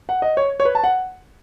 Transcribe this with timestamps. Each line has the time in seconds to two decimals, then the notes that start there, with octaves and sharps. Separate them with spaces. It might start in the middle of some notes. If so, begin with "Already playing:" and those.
0.09 F#5
0.22 D#5
0.37 C#5
0.60 C#5
0.65 B4
0.75 A5
0.84 F#5